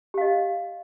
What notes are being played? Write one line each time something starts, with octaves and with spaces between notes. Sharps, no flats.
G4 D#5 F5